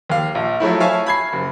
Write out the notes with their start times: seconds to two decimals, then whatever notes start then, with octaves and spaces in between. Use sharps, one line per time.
0.10 D#2 F5
0.35 A#1
0.60 F3 F#3 A3 E4
0.80 C#5 E5 F5 G#5 A5 C#6
1.06 B5 G#6 C7
1.33 F#1